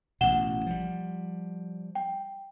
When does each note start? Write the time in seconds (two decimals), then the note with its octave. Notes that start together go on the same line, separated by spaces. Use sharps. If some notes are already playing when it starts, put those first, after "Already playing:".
0.21 A1 B2 F#5 E7 G7
0.66 F3 G3
1.95 G5